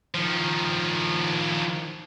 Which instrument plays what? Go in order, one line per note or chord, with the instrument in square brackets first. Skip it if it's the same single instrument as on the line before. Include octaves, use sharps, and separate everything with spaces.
[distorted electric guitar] D#3 F3